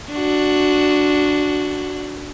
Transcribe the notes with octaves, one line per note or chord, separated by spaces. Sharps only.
D4 F#4